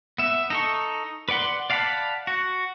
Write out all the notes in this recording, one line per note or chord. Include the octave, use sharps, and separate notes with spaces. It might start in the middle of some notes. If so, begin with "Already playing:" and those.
B3 E5
D#4 A4 C#6
B4 D5 F#5 C6
D5 F5 F#5 A5 B5
F#4